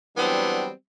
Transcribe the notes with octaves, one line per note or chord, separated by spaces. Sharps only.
E3 F#3 G3 B3 C4 D4